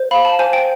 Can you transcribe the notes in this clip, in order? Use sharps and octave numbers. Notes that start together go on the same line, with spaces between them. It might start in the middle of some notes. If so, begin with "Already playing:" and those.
Already playing: C5
F5 B5
A5
C5 G#5
G5